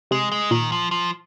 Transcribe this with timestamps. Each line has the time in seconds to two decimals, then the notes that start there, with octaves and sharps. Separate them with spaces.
0.11 C3 G#3
0.32 G#3
0.51 A#2 D#3
0.72 F3
0.91 F3